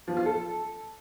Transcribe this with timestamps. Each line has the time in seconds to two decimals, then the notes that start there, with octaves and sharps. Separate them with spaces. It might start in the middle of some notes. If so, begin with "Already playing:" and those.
0.08 F3
0.17 F4
0.26 A4